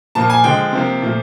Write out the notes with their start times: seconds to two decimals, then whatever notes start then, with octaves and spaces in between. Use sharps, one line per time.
0.15 A#2 F3 A#3 A5
0.30 G#5
0.44 D3 F3 G#3 G5
0.73 C3 F3 A#3
1.02 A#2 F3 A3